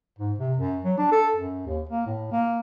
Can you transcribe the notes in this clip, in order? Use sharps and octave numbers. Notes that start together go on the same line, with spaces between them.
G#2
C3
F#2
F#3
D4
A4
F#2
D#2
A#3
A2
A#3